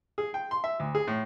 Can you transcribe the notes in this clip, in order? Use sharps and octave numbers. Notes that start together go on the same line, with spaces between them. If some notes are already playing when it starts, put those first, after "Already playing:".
G#4
G5
C6
E5
D2
G#4
A2